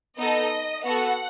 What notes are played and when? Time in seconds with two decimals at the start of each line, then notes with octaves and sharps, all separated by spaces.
0.17 B3 D#4 A4 D#5
0.83 B3 F#4 A4 F#5